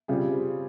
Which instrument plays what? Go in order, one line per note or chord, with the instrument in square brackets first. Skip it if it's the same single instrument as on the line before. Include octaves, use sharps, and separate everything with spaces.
[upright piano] C#3 G3 C4 F4 G#4